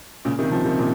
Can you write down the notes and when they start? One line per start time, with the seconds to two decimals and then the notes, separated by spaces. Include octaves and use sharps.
0.25 A#2 C#3
0.39 C3 D#3
0.51 C#3 F3
0.64 C3 D#3
0.78 A#2 C#3